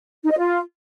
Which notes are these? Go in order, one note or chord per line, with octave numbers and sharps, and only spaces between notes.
D#4
D#5
F4